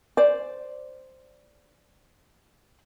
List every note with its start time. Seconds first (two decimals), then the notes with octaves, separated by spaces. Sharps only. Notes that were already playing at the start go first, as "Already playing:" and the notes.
0.17 C5 D5